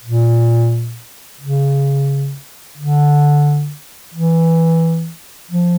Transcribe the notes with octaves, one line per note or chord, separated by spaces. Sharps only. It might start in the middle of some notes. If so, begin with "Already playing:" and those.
A#2
C#3
D3
E3
F3